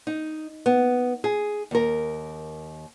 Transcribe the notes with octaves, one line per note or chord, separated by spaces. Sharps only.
D#4
B3
G#4
D#2 A#4